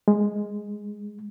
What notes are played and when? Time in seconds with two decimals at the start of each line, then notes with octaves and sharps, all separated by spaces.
0.08 G#3